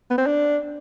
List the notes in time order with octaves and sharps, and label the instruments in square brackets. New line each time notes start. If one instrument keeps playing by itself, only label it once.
[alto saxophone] B3
C4
D4